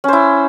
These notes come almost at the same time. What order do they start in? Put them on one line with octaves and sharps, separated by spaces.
C#4 C5 E4